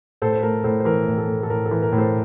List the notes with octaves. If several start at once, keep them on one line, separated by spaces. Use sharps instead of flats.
A2 A4 C5
C5
A3 A#4
A2 A4 C5
C5
E3 A#4
A2
A4
A3
A4
A2 A#4
A4
E3
A#4
A2
A4 C5